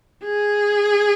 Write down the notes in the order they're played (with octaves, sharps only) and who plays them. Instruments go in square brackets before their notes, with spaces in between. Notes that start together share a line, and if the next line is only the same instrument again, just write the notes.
[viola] G#4